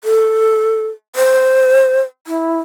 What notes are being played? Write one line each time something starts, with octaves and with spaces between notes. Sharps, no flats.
A4
C5
E4